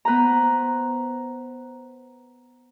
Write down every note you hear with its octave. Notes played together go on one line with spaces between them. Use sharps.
B3 B4 C5 A#5